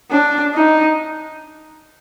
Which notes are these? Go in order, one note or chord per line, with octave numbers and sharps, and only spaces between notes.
D4
D#4